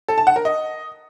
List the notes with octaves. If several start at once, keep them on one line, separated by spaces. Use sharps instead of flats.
A4
A5
F#5
A#4
D#5